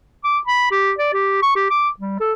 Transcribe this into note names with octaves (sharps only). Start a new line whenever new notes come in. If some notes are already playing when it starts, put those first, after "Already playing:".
D6
B5
G4
D5
G4
C#6
G4
D6
G3
A4